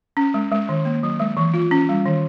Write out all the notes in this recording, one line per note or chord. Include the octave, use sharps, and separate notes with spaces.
C#4
G#3
G#3
D#3
A#3
F#3
G#3
E3
F4
C#4
G3
D#3